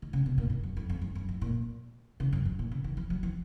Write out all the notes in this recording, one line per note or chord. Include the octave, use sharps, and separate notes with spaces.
D#3
C#3
B2
A#2
G#2
F#2
F2
F2
F#2
F#2
G#2
A#2
C#3
F#2
G#2
A#2
C#3
D#3
F3
F#3
F3